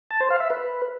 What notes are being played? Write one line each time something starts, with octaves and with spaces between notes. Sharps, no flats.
A5
C5
F5
E5
B4